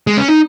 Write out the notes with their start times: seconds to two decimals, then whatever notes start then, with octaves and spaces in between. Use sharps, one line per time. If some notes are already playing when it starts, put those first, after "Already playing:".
0.07 G#3
0.17 C#4
0.28 D#4